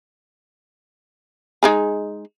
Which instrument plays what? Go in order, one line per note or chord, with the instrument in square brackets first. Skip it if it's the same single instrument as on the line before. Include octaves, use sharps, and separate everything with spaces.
[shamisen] G#3 D#4 G#4